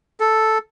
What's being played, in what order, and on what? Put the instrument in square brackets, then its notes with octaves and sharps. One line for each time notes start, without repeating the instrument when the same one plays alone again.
[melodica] A4